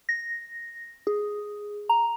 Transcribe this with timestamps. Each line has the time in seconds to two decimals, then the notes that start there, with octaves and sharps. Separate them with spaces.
0.09 A#6
1.07 G#4
1.89 A#5